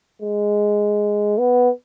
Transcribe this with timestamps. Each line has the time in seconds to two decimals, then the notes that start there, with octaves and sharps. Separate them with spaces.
0.22 G#3
1.39 B3